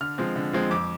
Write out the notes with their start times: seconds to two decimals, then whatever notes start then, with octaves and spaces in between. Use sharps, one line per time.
0.01 D3 F6
0.18 F3 G#3 C4
0.36 D3
0.53 F3 G#3 C4
0.71 F2 D6